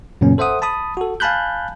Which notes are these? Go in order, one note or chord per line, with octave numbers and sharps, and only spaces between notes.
F#2 A#2 C#3 A#3 B3 C#4
A4 C5 E5 F#5 D#6
A5 B5 D#6
F#4 A4
F5 G#5 A5 B5 F#6 G6